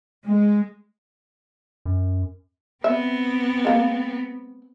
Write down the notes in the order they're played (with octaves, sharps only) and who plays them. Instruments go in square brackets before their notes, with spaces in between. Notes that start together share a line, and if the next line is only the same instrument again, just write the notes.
[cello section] G#3
[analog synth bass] F#2
[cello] B3 C4 [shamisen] E5
[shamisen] G#3 A#3